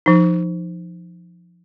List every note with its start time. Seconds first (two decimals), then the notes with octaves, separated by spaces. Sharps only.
0.06 F3 D#4